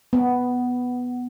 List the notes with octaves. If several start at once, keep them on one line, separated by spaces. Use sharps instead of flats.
B3